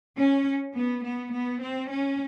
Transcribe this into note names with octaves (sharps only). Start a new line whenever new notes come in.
C#4
B3
B3
B3
C4
C#4